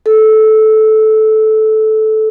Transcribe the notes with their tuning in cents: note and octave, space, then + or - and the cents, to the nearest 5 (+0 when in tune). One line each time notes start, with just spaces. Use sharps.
A4 -15